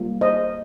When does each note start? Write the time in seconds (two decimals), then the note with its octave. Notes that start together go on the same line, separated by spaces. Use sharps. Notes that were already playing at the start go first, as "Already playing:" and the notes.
Already playing: G3 A#3 F4
0.21 C5 D#5